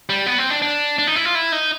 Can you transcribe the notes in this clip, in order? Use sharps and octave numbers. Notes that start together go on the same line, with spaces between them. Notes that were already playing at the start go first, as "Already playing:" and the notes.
G3
B3
C4
D4
D4
D4
D#4
E4
F4
E4
D#4